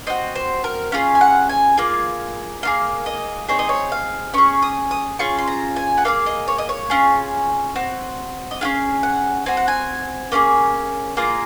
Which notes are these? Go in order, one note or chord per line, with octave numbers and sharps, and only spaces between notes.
C4 F#4 D#5
C5
A#4
C#4 F4 G#4 F5
G#5
F#5
G#5
A#3 F4 G#4
A#3 F4 G#4 F5
D#5
C4 D#4 G#4 C#5
D#5
C#5
F5
C#4 G#4 C#6
D#6
D#6
C#4 F4 G#4 C#6
C6
A#5
G#5
F#5
A#3 D#4 G#4 F5
D#5
C#5
D#5
C#5
C#4 F4 G#4
C4 F#4
D#5
C#4 F4 G#4 F5
F#5
C4 F#4 G#5
F#5
G#5
A#3 C#4 F4 G#4
A#3 F4 G#4 A#5